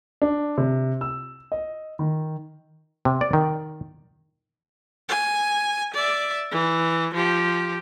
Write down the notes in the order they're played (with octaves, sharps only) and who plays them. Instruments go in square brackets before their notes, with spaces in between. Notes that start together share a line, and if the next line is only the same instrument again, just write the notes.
[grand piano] D4
C3
E6
D#5
D#3
[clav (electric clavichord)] C3
D5
D#3
[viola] G#5
D5 E5
E3
F3 G4